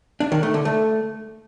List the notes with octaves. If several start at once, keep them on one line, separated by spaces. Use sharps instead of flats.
D4
D#3
A3
D3
A3